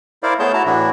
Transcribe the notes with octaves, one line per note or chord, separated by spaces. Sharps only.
E4 A#4 C5 D5 F5
A3 B3 G#4 C#5 A5 G6
E4 F#4 A5 A#5
A2 E3 D4 E4 F#4